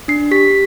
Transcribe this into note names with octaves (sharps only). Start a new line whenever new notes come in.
D4 C7
G4 B6